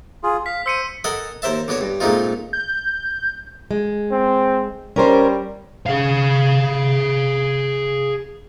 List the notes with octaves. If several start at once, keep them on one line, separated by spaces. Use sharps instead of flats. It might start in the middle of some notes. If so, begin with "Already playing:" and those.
F4 G#4
F5 B6
C5 E6 C#7 D#7
A4 A#4 D#5 F#5 G#5
D#2 A#4 C5 E5 A5
D3 B3 F#4 C#5
G2
A#2 G#3 A3 C4 D#4 F4
G6
G#3
C4
G3 C#4 A#4 C5
G#4 F5